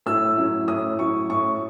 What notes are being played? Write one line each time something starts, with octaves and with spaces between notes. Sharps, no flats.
A2 E6
F#3 C#4 E4
A2 D#6
F#3 C#4 E4 C#6
A2 C#6